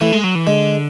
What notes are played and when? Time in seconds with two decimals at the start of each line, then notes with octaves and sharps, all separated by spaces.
0.01 E3 A3
0.13 G#3
0.24 F#3
0.35 E3
0.47 D3 G#3